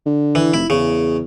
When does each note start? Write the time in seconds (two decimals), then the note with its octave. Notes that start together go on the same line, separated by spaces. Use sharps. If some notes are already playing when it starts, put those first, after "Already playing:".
0.06 D3
0.35 E3
0.54 F1 E4
0.70 E2 C#3